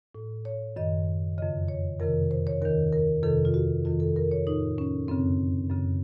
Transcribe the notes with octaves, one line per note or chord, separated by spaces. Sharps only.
A2
C#5
F#2 D#3 D#5
F2 C#3 D#5
C#5
F2 C3 D#3 A#4
C5
C#5
D#2 D#3 A#4
A#4
F2 C3 D#3 A4
F4
F#4
F2 D#3 F4
A4
A#4
C#5
A2 D#4
C#4
F#2 C#3 C4
F#2 C#3